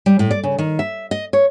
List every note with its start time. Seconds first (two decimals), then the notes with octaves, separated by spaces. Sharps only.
0.06 G3
0.19 A2
0.31 D5
0.44 C#3
0.58 D#3
0.79 E5
1.11 D#5
1.33 C#5